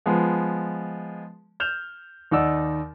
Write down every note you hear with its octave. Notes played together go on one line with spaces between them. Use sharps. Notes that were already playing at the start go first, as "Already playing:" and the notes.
F3 G#3 B3
F6 G6 E7 F7
D#2 D#4 D5 F#5 E6